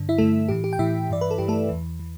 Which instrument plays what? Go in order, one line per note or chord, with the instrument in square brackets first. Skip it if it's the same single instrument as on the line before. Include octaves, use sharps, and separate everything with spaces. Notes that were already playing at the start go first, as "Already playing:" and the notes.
Already playing: [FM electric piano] G2 D3
E4 E5
G2 D3 A3 A4
A2 E3 G4
G4
G5
A2 E3 E4 E5
G2 E3 D5
B4
A4
G2 E3 G4
A3 A4
E2 E3
E3